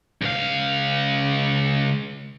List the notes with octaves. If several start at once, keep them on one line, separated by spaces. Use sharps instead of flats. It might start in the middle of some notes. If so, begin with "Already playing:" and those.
C#2 F5